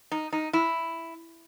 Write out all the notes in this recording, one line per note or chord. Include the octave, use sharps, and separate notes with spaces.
D#4
D#4
E4